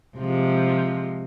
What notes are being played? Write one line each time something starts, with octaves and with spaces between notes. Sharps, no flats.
C3 F3 G#3